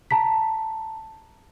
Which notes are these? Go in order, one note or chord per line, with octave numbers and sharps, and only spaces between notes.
A5 A#5 B6